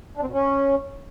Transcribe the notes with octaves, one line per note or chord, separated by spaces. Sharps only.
D4
C4
B2
C#4